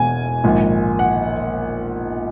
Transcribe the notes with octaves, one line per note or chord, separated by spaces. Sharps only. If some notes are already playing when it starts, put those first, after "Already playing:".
Already playing: E1 E2 B2 G#3 G#5
A#1 G#2 D#3
F#5